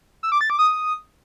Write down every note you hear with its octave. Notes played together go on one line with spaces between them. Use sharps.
E6
D6
A6
D6
D#6